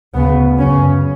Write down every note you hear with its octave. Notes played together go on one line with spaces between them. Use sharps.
D2 C#3 B3
F#2 C#3 C#4